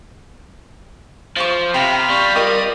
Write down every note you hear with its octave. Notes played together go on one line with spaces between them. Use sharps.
F3 F4 C5 C#6
C3 A#4 F5 G5 B5 C6
G3 C#6
F4 G4 A#4 D#5